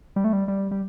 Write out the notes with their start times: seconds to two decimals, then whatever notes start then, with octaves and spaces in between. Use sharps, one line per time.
0.16 G3
0.24 A3
0.33 G3
0.48 G3
0.71 G3